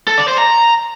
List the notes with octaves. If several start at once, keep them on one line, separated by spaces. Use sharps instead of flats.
A4
D5
C5
A#5